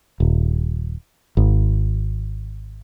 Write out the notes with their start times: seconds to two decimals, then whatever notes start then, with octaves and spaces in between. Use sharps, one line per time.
0.20 D#1
1.37 G#1